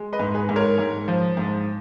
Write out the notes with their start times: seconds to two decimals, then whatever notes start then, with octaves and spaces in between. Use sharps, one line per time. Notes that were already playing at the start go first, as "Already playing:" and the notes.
Already playing: G#3
0.13 B4 D#5
0.20 G#2
0.34 G#4 B4
0.49 G#2
0.56 A#4 C#5
0.78 G#2
1.08 F3
1.37 G#2